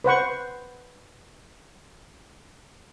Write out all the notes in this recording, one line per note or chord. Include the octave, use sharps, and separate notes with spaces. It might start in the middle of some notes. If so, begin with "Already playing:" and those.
B4 C5 F#5 C#6